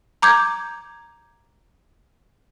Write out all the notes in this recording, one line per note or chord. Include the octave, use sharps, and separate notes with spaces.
A#5 D6 G6 G#6